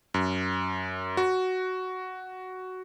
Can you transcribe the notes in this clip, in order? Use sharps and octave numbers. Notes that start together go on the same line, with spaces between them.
F#2
F#4